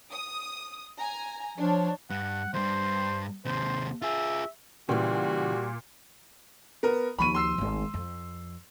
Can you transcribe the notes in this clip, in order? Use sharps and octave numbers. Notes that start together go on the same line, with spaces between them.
D#6
G#5 A#5
F3 D4 C#5
G2 F#5
E2 G2 C5
D#2 C3 C5
F4 G#4 E5
A#2 C#3 E3 G3 F#4
B3 A#4
D#2 F3 B5 C#6 D#7
C6 E6 C7
G#1 A3
F2